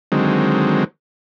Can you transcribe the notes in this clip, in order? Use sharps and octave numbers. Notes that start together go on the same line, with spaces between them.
D3 D#3 F#3 G#3 C4